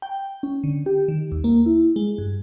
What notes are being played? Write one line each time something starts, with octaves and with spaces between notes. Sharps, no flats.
G5
C#4
D3
G4
D#3
D#2
A#3
E4
G#3
G2